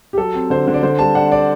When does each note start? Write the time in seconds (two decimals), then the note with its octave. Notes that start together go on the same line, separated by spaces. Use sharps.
0.13 G4
0.18 F#3 A4
0.34 C4
0.50 D3 C5
0.67 D3
0.74 D5
0.83 D3 C5
0.99 G3 A5
1.15 D4 F#5
1.32 D5